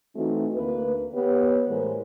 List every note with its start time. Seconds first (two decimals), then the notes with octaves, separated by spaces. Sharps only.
0.16 E3 A3 C4 D#4 F#4
0.55 D2 A#3 B4
1.14 B3 G4 C#5
1.68 A2 E3 G#3 A#4 C5